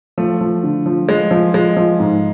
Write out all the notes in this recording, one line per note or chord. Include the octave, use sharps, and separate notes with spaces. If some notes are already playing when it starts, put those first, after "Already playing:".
F3 A3
F3
D3
F3
F3 G#3
F3
F3 G#3
F3
G#2